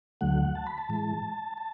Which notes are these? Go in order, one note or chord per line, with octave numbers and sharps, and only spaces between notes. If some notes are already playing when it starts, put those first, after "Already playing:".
D2 D3 F#3 A3 F#5
A5
B5
A5
A2 E3 G#3
A5